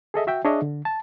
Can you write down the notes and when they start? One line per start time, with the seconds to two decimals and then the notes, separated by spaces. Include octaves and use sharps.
0.14 G#4 A4 D#5 E5
0.27 F#4 E5 G5
0.45 D4 G#4 C#5 D#5 E5
0.62 D3
0.85 A5